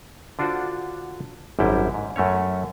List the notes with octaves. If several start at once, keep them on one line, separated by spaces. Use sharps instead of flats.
D3 D4 F4 F#4 C5
G#1 F#2 G3 E4 G5
G#2
F#2 A3 C#4 C#5